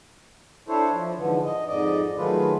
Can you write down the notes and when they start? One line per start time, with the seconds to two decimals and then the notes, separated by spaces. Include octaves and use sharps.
0.68 D4 E4 A4 C5 C#5
0.92 F3
1.17 G#2 D3 E3 F3
1.44 D#5
1.67 F2 G#2 D5 D#5
2.17 D#3 F#3 G#3 A3 F4 B4